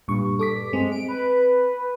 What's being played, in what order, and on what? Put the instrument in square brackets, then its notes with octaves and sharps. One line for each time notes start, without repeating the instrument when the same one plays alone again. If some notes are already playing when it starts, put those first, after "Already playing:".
[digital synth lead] G2 [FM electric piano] A#2 C#6
[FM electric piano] A4 D6 B6
[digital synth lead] G#3 [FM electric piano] C4
[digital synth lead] D7
B4